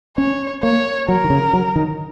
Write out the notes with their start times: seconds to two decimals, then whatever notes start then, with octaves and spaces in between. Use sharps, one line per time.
0.18 C#4 C#5
0.63 A#3 C#5
1.08 F#3 A#4
1.24 D#3
1.30 C#3
1.53 F#3
1.76 D#3